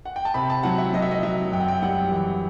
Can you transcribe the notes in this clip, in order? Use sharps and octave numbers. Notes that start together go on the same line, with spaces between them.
F#5
G5
A5
C3 B5
A5
F#3 F#5
E5
F#3 D#5
E5
D#5
F#3 E5
F#2 G5
F#5
G5
G3 F#5
E3 F#5